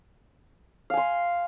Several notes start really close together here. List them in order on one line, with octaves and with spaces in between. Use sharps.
F5 G#5 C6